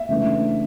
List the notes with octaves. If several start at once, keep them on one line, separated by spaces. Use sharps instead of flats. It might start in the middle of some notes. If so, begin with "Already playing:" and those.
Already playing: E5
C#3 E3 A3 D4